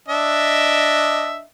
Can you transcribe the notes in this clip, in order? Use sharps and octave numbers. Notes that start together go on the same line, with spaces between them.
D4 D#5 E5